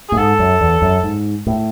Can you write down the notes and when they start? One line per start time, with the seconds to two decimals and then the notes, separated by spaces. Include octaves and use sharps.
0.09 G#4
0.12 A2
0.17 G#2 A4
0.39 F#2
0.61 E2
0.82 F#2
1.03 G#2
1.47 A2